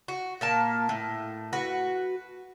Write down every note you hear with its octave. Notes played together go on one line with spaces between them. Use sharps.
F#4
A#2 A#3 A5
A2
F#4 B4